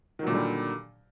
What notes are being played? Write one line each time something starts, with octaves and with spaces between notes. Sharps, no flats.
A#2 D3 D#3 F#3 G3